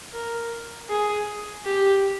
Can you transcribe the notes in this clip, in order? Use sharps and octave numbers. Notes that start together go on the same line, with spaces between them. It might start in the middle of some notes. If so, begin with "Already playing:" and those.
A#4
G#4
G4